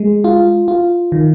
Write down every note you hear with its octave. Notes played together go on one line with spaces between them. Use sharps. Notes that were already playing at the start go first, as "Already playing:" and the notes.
Already playing: G#3
F4
F4
D#3